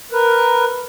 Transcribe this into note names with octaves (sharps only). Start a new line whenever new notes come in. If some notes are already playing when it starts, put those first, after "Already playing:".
A#4 B4